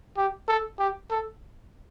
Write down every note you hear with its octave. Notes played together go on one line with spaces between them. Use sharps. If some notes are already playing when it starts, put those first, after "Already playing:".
G4
A4
G4
A4